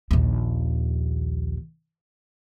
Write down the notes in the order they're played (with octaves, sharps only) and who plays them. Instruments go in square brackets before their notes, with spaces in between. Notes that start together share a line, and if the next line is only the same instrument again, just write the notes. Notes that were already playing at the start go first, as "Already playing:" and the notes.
[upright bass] A#1 D#2